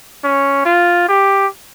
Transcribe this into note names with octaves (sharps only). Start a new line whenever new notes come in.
C#4
F4
G4